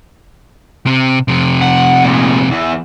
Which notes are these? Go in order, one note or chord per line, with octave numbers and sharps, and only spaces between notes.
C3
F2 C3
F#5
A#2 G#3
E2 E3